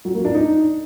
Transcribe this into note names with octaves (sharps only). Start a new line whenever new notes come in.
F#3
A#3
D4
D#4